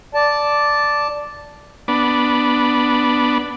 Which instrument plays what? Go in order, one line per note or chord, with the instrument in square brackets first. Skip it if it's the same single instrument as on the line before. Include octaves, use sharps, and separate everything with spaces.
[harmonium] D5 A5
[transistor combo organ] B3 D4